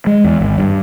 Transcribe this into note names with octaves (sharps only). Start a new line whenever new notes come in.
G#3
E2
G#1
G2